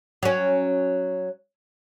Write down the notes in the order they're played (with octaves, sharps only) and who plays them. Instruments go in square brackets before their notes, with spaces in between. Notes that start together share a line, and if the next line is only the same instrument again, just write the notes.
[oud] F#3 C#4